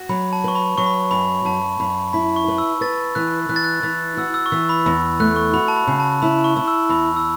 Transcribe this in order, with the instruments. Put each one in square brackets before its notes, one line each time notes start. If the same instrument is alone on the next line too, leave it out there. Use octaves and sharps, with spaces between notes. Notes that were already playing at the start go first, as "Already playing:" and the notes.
Already playing: [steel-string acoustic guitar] F#4
[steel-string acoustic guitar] F#3 [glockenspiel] B5
[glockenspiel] A5
[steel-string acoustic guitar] B4 [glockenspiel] C#6
[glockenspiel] B5
[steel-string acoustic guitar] F#3 [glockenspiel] C#6
[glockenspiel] B5
C#6
[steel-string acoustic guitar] F#2 [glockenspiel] B5
[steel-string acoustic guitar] F#2 [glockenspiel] A5
[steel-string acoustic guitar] F#2 [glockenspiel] B5
[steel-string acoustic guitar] E4 [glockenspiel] B5
[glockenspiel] C#6
[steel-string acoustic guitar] B4
[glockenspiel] E6
[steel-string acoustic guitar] B4 [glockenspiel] A6
[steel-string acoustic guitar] E3 [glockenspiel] F#6
[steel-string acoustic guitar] E3 [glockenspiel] F#6
[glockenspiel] A6
F#6
[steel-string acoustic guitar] E3 [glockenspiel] A6
[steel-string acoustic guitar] F#4 [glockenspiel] E6
[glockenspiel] E6
C#6
[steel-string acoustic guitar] E3 [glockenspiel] E6
[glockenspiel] B5
[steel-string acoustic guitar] E2 [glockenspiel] B5
[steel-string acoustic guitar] A3 [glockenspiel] F#6
[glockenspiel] C#6
[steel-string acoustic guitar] F#4 [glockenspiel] B5
[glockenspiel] A5
B5
[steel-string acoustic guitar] C#3
[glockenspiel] A5
[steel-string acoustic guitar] E4 [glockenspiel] B5
[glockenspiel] C#6
[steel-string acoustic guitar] E4
[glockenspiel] E6
[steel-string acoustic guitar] E2 [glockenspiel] B5
[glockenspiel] E6